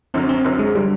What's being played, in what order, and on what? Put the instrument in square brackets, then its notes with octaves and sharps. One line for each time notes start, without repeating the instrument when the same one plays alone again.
[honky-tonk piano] F#2 D3 F#3 [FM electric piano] C4
[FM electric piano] C4
[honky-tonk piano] F#2 D3 F#3
[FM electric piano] G#3
[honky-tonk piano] D3 F#3 [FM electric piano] G3